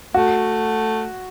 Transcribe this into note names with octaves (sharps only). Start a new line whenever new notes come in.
A3 F#4